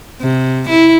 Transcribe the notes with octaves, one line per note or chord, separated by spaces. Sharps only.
C3
E4